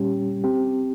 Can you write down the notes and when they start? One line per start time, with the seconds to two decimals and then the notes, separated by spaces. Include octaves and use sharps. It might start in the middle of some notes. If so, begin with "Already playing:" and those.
Already playing: A#2 G3 C#4 G4
0.44 C4 G4